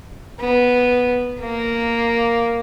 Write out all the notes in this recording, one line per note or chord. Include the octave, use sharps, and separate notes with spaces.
B3
A#3